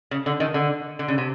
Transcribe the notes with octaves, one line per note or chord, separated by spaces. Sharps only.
C#3
D3
D#3
D3
D3
C#3
C3